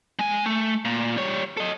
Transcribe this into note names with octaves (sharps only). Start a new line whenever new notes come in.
G#3 G#5
A3
A#2
G3 C#5
A4 D#5